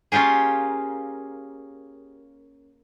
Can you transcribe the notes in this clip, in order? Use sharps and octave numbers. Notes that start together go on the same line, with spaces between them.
A#3 C#4 F4 G4 G#4